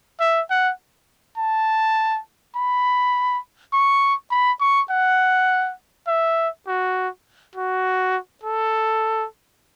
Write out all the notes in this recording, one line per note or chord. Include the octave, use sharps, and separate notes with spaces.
E5
F#5
A5
B5
C#6
B5
C#6
F#5
E5
F#4
F#4
A4